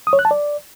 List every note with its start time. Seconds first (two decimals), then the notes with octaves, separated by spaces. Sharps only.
0.07 D#6
0.13 C#5
0.19 F#6
0.25 A5
0.31 D5